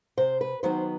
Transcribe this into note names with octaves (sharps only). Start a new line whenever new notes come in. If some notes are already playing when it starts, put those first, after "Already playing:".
C3 C5
B4
D#3 F#3 B3 C5